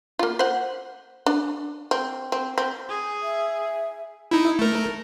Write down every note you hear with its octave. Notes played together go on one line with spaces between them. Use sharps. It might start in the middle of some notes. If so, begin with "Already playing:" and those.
A#3 F4
C5 F#5
D4
C4
C4
C4
G#4
E5
D#4 E4
A3 A#4